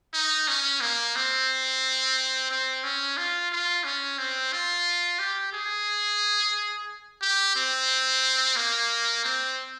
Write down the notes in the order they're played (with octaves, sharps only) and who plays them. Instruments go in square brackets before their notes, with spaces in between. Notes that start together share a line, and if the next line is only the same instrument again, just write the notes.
[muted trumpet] D#4
C#4
A#3
C4
C4
C#4
F4
F4
C#4
C4
F4
G4
G#4
G4
C4
A#3
C4